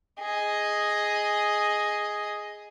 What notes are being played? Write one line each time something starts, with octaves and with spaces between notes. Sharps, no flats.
G#4 D#5